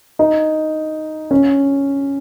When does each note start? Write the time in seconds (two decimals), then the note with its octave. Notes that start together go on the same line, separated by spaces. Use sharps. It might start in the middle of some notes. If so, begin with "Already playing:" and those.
0.19 D#4
1.31 C#4